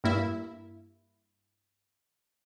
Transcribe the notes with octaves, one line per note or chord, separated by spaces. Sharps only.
G2 A#3 E4